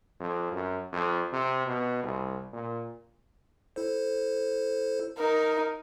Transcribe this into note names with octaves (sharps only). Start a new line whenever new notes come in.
F2
F#2
F2
C3
B2
C2
A#2
E4 A4 C5
D#4 A#4